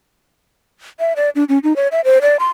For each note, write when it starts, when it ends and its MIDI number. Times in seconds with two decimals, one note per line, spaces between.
1.00 1.13 76
1.16 1.30 74
1.35 1.44 62
1.49 1.59 61
1.63 1.75 63
1.76 1.88 73
1.92 2.01 76
2.05 2.18 72
2.22 2.37 74
2.39 2.49 84